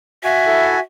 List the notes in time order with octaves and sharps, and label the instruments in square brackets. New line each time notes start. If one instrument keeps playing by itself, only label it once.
[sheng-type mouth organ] F#4 G#5 [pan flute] E5 [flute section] F5
[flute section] E4 A4